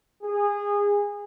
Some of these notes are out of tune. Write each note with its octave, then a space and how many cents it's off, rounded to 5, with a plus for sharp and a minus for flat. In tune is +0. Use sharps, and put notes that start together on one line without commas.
G#4 -25